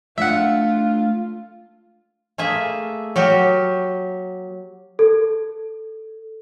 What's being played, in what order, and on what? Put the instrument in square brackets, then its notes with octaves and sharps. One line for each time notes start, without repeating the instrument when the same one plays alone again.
[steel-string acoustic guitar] A3 D4 [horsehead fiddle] F4 [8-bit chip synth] E5 F#5
[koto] A3 A#3 G#4 E5
F#3 F#4 G4 A#4
[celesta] A4